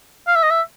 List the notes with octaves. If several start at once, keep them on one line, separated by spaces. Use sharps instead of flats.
F5
E5
D#5
E5